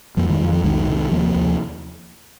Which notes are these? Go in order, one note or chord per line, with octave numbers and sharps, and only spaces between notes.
F2 F3 A#3
D#3 G#3
F2 F3
F3
C2 D#3 G#3
C3
D#2 F3 A#3
D#2